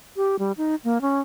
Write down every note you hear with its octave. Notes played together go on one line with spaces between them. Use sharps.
G4
G3
D#4
A#3
C#4